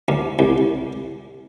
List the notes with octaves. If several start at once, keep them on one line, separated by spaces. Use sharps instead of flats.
D2
C2